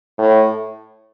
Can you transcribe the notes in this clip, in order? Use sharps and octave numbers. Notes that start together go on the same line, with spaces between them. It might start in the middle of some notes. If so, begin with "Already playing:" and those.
A2